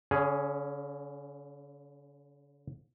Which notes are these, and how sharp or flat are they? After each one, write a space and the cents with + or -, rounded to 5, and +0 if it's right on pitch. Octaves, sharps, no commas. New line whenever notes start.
D3 -45 C#4 +0 G#4 +0